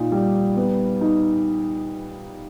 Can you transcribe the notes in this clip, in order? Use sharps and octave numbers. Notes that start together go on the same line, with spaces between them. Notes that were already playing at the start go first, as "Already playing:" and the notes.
Already playing: A#2 D#4
G3
B3
D#4